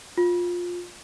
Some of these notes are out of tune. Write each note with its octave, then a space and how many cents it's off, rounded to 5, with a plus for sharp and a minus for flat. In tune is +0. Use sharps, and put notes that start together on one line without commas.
F4 +15